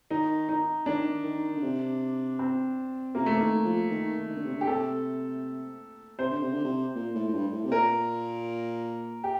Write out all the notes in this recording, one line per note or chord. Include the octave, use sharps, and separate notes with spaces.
D#3 D#4
D#4
D#3 D4
D#3
D3
C3
C4
C3 A#3
A3
D#3 A#3
F3
D#3
D#3
D3
C3
D3
G4
C3 A4
C3 C5
D3
C3
D3
C3
A#2
A2
A2
G2
A2
C3
A#2 A#4
G4